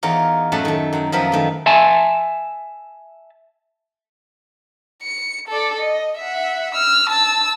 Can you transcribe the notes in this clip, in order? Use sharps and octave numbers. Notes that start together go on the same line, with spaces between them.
E2 D#4 F4 A#4 C#5
F#2 A2 A3 A4 F#5 A5
D#3 A3
F#2 A#5
F#2 F3 B3 A#4 E5
D#3 A3
E5 G#5 A5
C#7
A4 D5
D#5
E5 F#5
E6 F6
A5 E6